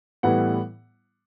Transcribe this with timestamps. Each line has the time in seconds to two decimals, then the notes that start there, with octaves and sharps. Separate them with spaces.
0.23 A2 E3 G3 B3 E4 F#5